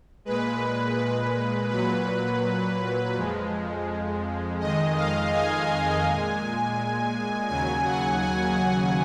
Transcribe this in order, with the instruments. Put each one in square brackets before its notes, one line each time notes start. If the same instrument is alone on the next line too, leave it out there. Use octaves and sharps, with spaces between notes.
[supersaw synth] A#2 G#3 B4
B4
A#2 F#3 B4
F2 F3 G#3
F2 D#3 G#3 D#5
F5
G#5
G#5
A#2 G#3
D#2 C#3 F#3 G#5
F#5
G#5
F#5